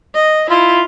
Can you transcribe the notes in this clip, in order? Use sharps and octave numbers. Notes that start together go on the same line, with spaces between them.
D#5
E4 F4